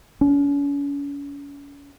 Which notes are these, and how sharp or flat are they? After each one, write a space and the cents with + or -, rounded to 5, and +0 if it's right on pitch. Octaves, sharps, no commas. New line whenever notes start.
C#4 +40